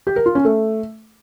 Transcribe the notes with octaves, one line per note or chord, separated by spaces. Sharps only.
G4
A#4
F4
C#4
A3